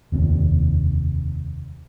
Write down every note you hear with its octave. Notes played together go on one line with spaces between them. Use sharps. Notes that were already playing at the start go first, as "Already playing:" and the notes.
F1 D#2 C3